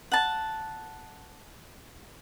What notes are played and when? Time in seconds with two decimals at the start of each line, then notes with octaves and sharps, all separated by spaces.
0.12 F#5 A5